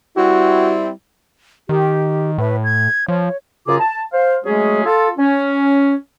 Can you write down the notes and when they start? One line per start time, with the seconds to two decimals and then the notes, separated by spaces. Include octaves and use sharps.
0.17 G3 C4 E4 F#4
1.69 D#3 G4
2.38 A2 B4
2.64 G#6
3.08 F3 C#5
3.67 F#2 C#3 F4 G#4 A#5 D6
3.80 A5
4.13 C5 F5
4.44 F#3 G#3 A3 C#4 G#4
4.84 F4 A4
5.18 C#4